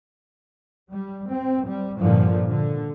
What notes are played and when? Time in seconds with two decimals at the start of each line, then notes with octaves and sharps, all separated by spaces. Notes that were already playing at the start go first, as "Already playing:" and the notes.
0.91 G3
1.29 C4
1.66 G3
1.99 G2 A#2 D3 F3
2.49 D3